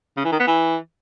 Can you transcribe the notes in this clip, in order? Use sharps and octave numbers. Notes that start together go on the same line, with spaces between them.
C#3
E3
D#3
B3
E3